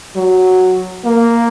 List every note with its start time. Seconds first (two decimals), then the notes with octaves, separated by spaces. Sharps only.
0.16 F#3
1.05 A#3